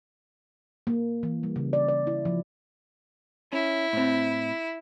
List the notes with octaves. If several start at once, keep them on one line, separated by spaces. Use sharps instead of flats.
A#3
E3
G3
C#3
D5
D5
E4
F3
C#4 E4
A2 C4